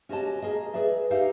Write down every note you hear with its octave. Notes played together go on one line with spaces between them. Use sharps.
C#4 F#4 G4 D5 D#5 A5
G#4 A#4 D#5
G#4 B4 D5 E5
D#4 G4 E5 F5